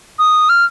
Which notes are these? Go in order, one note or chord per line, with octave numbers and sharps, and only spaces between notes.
D#6
F6